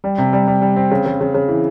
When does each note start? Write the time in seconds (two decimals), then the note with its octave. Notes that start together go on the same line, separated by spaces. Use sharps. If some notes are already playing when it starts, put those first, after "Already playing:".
0.04 G3
0.18 C3
0.33 G3
0.47 G3
0.62 G3
0.76 C4
0.91 C#3
1.06 C#3
1.21 C#3
1.34 C#3
1.49 E3